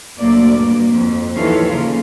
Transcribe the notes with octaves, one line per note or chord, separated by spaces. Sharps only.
D2 A#2 F#3 A3 A#3 D5
G2 A#3
F2
D#2 E3 F3 A4 C#5 F5
C#3 A#3 F4